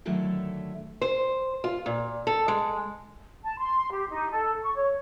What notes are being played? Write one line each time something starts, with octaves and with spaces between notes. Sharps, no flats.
D3 D#3 F#3 A3 E4 A4
C5
F4
A#2
A4
G#3
A5
C6
G4
D#4
A4
C#6
C#5